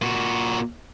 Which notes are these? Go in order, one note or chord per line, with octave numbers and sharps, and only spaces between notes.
A#2 F#4